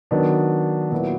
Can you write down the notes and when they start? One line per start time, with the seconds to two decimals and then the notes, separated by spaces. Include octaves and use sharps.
0.11 D#3 F#3 B3 D4
0.91 A#2 F#3 B3 E4